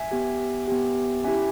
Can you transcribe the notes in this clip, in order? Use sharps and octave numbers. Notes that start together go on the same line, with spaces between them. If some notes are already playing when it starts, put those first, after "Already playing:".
Already playing: E5 G#5
B3 G4
B3 G4
C#4 E4 G4 E5 G#5